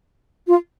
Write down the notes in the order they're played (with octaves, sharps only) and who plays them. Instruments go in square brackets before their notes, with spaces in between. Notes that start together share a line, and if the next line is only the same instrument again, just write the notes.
[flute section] F4